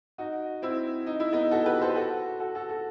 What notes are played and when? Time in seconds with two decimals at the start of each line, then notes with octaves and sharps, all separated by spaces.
0.18 D#4 F#4
0.62 C4 E4
1.06 D#4
1.20 E4
1.33 B3 D#4
1.51 F#4 A4
1.66 G4 B4
1.81 A4 C5
1.96 F#4 A4
2.40 F#4 A4
2.55 F#4 A4
2.69 F#4 A4